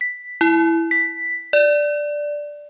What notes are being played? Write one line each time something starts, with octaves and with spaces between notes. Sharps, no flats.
B6
E4
B6
D5